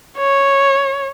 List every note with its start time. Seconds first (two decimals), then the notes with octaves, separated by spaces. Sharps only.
0.18 C#5